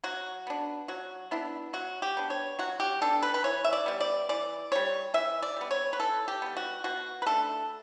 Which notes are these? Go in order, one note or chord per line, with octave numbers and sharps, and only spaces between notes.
F#3 F#4
B3 D4
F#3 F#4
B3 D4 E4
F#3 F#4
G4
B3 D4
C#5
F#3 F#4
G4
B3 D4 A4
B4
B4
E3 C#5
E5
D5
G3 B3
D5
E3 D5
G3 B3 C#5
E3 E5
D5
G3 B3
C#5
B4
E3 A4
G4
G3 B3
F#4
B2 F#4
B4
A3 D4 A4